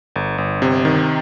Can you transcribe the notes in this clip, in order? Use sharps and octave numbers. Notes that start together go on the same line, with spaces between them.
G1
G1
C3
D#3